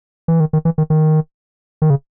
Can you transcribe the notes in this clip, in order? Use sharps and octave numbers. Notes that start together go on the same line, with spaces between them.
E3
D#3
D#3
E3
D#3
D#3
D#3
C#3